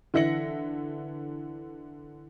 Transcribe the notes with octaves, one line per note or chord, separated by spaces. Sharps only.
D3 E3 E5 A#6 C#7 F#7